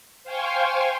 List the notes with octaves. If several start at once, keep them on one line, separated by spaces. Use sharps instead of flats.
C5 F5 G5 G#5 C6 C#6